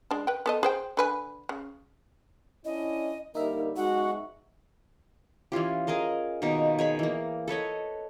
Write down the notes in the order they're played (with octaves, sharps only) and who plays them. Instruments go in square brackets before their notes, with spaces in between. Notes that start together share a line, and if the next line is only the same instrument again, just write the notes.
[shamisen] G#3 D4
B4 G5
B3 A4 D#5
G#4 C5 G5
D3 B4 G#5
C#3
[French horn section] C#4 D4 E4 [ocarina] D#5
[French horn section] D3 G3 A#3 [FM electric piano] D#4 E5 [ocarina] A#4
[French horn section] F#2 B2 G#3 [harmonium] F#4 [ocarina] F#5
[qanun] E3 C#4 F4 G4
G#4 A#4 D#5 F5
B2 D#3 A#3 D#4
G#4 C#5 B5
E3 A#3
A4 B4 C#5 D#5